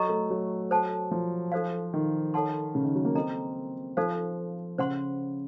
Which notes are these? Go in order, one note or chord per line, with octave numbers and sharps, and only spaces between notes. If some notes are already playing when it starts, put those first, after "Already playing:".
Already playing: F#3 A4 D#5 A#5 C#6
A3
F#3
A4 C5 F#5 A5
F3
D#4 A4 C5 F5
D#3
A4 C#5 F#5 A5 C6
C#3
D#3
F#3
A#3
C4 A4 D#5 A#5
F3 D#4 A4 C5 F5
C#3 C5 F#5 C6